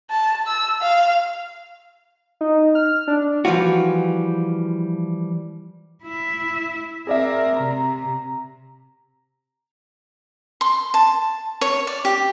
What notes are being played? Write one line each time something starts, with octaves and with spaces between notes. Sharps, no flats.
A5
E6
F5
D#4
F6
D4
E3 F3 G3 F4 F#4
E4 E5
C4 G#4 A#4 D5 E5
C3 A#5
C6
A5
C#5
D5
G4